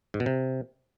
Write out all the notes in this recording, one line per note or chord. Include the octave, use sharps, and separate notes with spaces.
G#2
B2
C3